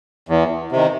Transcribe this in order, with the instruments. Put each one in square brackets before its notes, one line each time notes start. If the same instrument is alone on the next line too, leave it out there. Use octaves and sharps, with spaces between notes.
[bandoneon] E2
C3 D#3